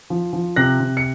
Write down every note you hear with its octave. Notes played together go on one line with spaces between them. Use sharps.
F3
F3
C3 F#6 A#6
C3
C#7